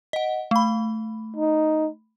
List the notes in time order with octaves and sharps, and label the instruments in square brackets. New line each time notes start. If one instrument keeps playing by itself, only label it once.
[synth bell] D#5 F#5
A3 B5
[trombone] D#4